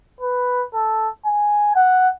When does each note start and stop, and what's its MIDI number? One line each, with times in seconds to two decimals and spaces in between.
0.20 0.64 71
0.74 1.09 69
1.25 1.73 80
1.75 2.09 78